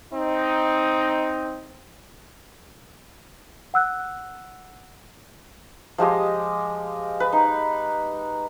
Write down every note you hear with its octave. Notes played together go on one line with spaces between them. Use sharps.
C4 D#4
F#5 E6 F#6
F3 G#3 G4 D#5
B4
D#4